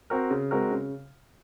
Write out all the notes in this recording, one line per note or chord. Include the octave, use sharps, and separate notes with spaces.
C4 F#4 A#4
C#3
G#3 C4 F#4 A#4
C#3